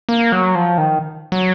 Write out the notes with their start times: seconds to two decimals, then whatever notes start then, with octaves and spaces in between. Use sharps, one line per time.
0.09 A#3
0.32 F#3
0.55 F3
0.78 D#3
1.32 F#3